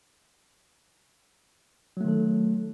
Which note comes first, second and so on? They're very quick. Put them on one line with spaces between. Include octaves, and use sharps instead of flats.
F#3 A3 D#3 A4